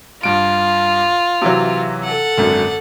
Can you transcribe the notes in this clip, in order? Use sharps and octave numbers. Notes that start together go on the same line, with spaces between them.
G2 F4 D7
C3 E3 F#3
A4 F#5
G#1 F#2 D3